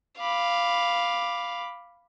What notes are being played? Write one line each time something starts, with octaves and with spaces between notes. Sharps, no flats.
F5 B5 D6